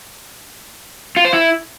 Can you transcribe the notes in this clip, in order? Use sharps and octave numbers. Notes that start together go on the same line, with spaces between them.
F4
C5
E4